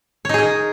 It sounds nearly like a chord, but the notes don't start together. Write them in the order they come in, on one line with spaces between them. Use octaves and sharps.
C#5 D#4 G#4 A#4